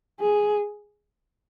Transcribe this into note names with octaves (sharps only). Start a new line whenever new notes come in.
G#4